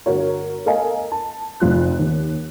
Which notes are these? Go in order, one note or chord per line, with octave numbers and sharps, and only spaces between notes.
G1 F#4 A#4 C#5
A4 A#4 D#5 F5 G#5
A5
F1 F2 F4 F#6
D#2